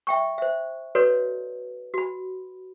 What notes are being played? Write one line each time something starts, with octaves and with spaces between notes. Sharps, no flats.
E5 G5 C#6
C5 E5
F#4 A4 B4 C#5 D5
F#4 B5